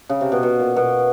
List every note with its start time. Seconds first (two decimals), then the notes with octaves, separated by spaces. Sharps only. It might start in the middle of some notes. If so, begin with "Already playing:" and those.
0.09 C#3
0.21 C3
0.32 B2
0.43 B2
0.60 A#2
0.76 B2